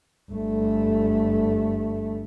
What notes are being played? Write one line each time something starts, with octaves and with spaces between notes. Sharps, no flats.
G1 A3